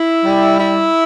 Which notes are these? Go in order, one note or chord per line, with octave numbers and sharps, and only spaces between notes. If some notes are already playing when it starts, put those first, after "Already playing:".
Already playing: E4
G3
E4